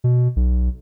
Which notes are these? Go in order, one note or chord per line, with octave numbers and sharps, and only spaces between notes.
B2
B1